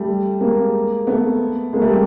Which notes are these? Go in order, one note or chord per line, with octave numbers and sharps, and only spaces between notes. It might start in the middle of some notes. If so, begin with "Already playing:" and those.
Already playing: G3 A3
G#3 A#3
A3 B3
G#3 A#3
G3 A3